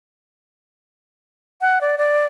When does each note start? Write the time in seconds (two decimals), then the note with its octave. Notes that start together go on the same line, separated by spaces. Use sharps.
1.61 F#5
1.81 D5
1.98 D5